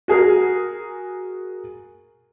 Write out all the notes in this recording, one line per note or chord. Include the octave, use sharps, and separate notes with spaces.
F#4 G#4 A#4